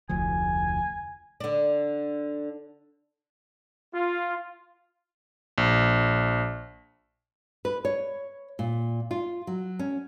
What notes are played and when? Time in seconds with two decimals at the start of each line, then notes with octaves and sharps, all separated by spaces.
0.09 F1 D2 F3 G#5
1.40 D3 D4
3.93 F4
5.58 A#1
7.65 B4
7.85 C#5
8.59 A#2
9.11 F4
9.47 F#3
9.79 C#4